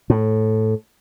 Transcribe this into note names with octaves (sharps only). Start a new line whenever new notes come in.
A2